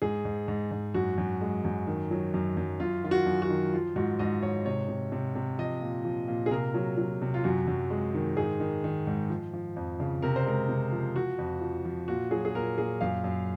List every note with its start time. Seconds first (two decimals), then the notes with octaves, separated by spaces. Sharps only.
0.02 G#2 G#4
0.25 G#2
0.48 G#2
0.71 G#2
0.94 F#2 F#4
1.18 F#2
1.41 G#3
1.65 F#2
1.87 D#3
2.11 F#3
2.34 F#2
2.57 F#2
2.80 F#2 F4
3.04 D#3 F4
3.11 F#4
3.26 F#2
3.42 F#4
3.50 D#3
3.73 F3 F4
3.96 G#2 F#4
4.19 G#2 D#5
4.43 G#2 C#5
4.66 C3 C#5
4.88 C3
5.12 C3
5.35 C3
5.59 F3 D#5
5.82 A#2
6.05 F3
6.28 A#2
6.46 G#4
6.51 C3 A#4
6.74 F#3
6.98 F#3
7.22 C3
7.34 F4
7.44 F#2 F#4
7.67 F#2
7.90 G#3
8.15 D#3
8.37 G#2 G#4
8.60 D#3
8.84 D#3
9.07 G#2
9.30 F3
9.54 F3
9.76 F2
10.00 C#3
10.22 C3 A#4
10.36 C5
10.46 G#3 A#4
10.69 C3
10.92 F3
11.15 F3 F#4
11.38 F2
11.62 F3
11.85 F3
12.08 A#2 F#4
12.31 F#3 G#4
12.45 G#4
12.55 A#2 A#4
12.78 A#2 G#4
13.01 F#2 F5
13.24 F#2